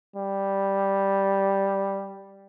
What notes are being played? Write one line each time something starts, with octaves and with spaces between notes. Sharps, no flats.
G3